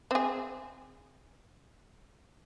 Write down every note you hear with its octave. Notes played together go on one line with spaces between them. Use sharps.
C4 G#4